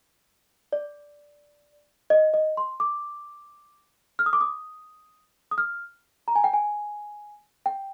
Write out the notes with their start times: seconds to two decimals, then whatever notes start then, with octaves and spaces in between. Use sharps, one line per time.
0.73 D5
2.10 D#5
2.34 D#5
2.57 C6
2.80 D6
4.19 F6
4.26 D#6
4.33 D6
4.41 D#6
5.51 D#6
5.58 F6
6.28 A#5
6.35 G#5
6.44 G5
6.53 G#5
7.66 G5